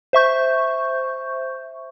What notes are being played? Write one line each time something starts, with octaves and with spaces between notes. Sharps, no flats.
C5 E5 C#6 G6